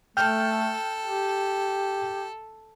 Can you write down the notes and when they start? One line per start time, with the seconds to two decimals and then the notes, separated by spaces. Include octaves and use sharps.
0.17 A3 A4 G5 F6 G6
1.06 G4